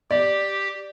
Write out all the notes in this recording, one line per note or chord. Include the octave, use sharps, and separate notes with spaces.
G4 D5